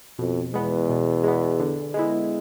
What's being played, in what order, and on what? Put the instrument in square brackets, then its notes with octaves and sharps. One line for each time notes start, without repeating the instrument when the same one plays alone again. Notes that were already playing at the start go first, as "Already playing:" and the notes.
[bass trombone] F2 [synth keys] B2
[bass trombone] E2 [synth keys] G#3 B3
[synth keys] B2
G#3 B3
D3
G#3 B3 E4